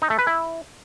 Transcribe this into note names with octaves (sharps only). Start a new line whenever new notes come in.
D#4
A3
B4
E4